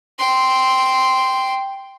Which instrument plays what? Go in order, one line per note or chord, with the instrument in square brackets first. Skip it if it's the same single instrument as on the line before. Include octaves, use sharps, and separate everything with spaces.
[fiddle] G5 C6